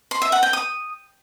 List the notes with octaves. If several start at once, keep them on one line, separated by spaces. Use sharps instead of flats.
C6
E5
F#5
G5
D#6